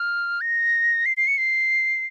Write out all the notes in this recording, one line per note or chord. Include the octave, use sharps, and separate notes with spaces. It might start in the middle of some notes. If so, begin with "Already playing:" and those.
Already playing: F6
A#6
C7
C7
C#7
C7